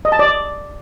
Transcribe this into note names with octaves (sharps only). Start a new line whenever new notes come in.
D#5
A5
D5